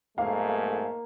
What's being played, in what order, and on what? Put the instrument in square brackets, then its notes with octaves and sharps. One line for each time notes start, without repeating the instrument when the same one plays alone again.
[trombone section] B1 G#2 A3 [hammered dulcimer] A#3 [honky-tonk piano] F5